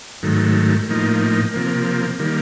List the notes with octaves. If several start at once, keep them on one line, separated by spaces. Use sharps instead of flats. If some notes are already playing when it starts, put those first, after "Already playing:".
G#2 D#3 F#3 A3
A2 F3 A#3 D#4
C3 F3 A#3
D#3 G3 A#3